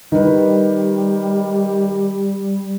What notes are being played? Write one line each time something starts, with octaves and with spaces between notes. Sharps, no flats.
D#3 G3 B4